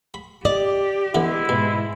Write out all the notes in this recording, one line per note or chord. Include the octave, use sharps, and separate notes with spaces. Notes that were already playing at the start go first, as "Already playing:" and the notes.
B5
G4 D5 D#5
D3 E3 G#3 B3 E4
G#2 B2